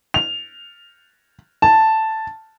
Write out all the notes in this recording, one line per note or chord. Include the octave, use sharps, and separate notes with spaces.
F7
A5